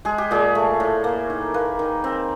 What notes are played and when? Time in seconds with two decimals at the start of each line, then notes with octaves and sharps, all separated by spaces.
0.05 G#3 G#4
0.18 G4
0.31 A#2 G#4
0.55 A3
0.80 A2
1.04 A#3
1.30 D#3
1.54 A#3 B4
1.79 D#3
2.04 C4